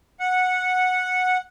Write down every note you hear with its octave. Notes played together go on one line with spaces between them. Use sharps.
F#5